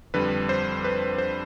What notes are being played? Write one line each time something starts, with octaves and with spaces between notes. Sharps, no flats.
F2 D3 G3 B4
C5
B4
C5